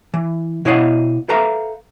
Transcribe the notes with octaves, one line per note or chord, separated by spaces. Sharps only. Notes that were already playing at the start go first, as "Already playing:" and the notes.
E3
B2 E4 C#5 D#5 F5 F#5
A4 B4 E5 F5 A#5